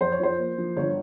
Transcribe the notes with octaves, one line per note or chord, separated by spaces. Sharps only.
F2 C5
C#5
F3 C5
A#3
F3
G1 C#5